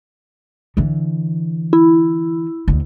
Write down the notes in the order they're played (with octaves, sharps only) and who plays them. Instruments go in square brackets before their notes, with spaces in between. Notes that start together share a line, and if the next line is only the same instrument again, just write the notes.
[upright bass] D3 E3
[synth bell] E4
[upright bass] D2 D#3